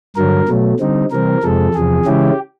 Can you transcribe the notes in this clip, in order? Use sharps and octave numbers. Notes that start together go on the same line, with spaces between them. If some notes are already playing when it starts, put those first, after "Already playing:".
G2 D3 F#3 A#4
B2 F#3 A3
D3 G3 C4 D#4
C3 E3 G3 C4 A#4
F2 C3 F3 G#3 A4
E2 C3 F3 G#4
C#3 E3 G#3 C#4 E4 G4